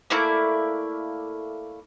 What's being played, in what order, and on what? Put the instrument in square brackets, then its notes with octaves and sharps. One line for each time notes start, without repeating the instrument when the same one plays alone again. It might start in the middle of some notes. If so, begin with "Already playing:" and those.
[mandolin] A3 A#3 E4 D5